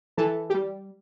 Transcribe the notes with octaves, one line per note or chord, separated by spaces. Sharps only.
E3 A4
G4
G3